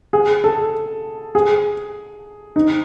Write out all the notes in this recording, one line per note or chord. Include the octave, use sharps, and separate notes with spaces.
G#4
A4
G#4
D#4